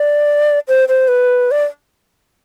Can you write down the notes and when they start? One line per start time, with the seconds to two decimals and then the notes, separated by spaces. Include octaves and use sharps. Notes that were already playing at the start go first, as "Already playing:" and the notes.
Already playing: D5
0.68 C5
0.88 C5
1.08 B4
1.51 D5